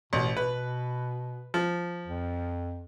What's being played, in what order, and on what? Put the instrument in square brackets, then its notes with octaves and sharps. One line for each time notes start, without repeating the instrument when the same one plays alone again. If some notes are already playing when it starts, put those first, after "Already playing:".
[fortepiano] A1 [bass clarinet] B2
[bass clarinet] B2 [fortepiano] B4
[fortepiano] F3
[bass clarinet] F2